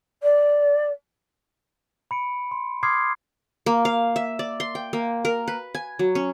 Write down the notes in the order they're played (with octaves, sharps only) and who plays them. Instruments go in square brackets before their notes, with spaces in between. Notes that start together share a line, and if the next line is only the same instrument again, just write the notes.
[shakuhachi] D5
[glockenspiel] B5 C#7 D7
C6
C6 D6 D#6 F6 G#6 C7
[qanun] A#3
F5
E5
D5
C6
G5
A#3
A#4
B4
G#5
F#3
C#4